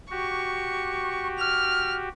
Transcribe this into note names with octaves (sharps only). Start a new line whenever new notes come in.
F#4 G4 C#6
F6